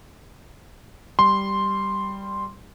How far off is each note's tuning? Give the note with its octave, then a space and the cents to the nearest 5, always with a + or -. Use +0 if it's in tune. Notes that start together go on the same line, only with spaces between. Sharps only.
G3 +0 C6 +0